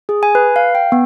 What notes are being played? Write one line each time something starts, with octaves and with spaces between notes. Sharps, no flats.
G#4
G#5
B4
F5
G5
B3